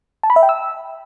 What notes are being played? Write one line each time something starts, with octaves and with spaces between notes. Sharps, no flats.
A5
B5
E5
G5
E6